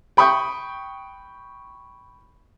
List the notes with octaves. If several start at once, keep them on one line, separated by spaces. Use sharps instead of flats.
G5 B5 C#6 D#6 G6